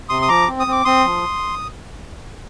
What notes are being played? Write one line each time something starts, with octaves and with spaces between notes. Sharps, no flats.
C3 C6 D#6
D#6
F3 A#5 D6
C4
D#6
C4 D6
C4 C6 D#6
F3